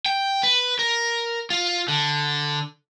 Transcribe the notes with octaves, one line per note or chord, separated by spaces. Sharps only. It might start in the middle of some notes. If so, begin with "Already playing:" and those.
G5
B4
A#4
F4
D3